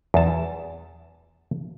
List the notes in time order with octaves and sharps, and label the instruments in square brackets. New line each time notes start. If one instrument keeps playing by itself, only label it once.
[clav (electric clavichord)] E2 A5